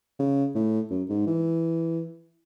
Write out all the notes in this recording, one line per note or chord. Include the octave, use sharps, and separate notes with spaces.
C#3
A2
F#2
G#2
E3